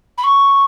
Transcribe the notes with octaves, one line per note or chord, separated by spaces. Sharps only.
B5
C#6